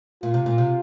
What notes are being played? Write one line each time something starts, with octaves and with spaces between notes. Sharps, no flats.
A#2 F4
C3
A#2
C3